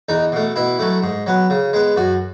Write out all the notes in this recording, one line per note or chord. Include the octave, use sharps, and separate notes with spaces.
E2 D#4
B2 A3
B2 E4
F#3 A3
G#2
F#3 B3
C#3
G#3 B3
F#2 F#4